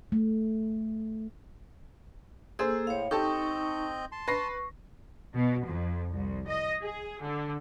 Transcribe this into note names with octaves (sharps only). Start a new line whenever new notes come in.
A3
A#3 G#4 A4 C5 E6
A2 C#5 F5
C4 D#4 G4 A4 D#5 C#6 G6
A5 C6
B4 C#6 A#6 C7
B2
F2
C2
D#5
G#4
D3